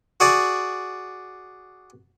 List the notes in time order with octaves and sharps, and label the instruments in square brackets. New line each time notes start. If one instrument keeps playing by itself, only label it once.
[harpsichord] F#4 G#4 D5